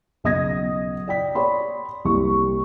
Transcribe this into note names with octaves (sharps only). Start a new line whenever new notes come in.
B1 C#3 D#5 D#6 G#6 A#6
D5 G5 B6
C#5 D5 B5 C6
C2 C3 A#3 G4 C#6